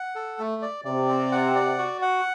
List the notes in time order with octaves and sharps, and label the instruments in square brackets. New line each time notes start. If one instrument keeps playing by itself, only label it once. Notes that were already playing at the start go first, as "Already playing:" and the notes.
Already playing: [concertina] F#5
A4
A3
D5
[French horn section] C3 [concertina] D5
[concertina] C4
F#5
D5
F#4
F#5